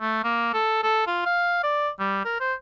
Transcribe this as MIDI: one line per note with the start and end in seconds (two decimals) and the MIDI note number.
0.01 0.22 57
0.24 0.49 58
0.54 0.79 69
0.83 1.03 69
1.07 1.24 65
1.26 1.60 77
1.63 1.89 74
1.99 2.21 55
2.25 2.36 70
2.40 2.54 72